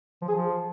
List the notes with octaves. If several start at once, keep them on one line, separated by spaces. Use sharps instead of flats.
F3
G#4
F3